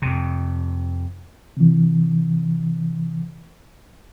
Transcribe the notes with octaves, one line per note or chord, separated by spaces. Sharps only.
F2 C3
C3 E3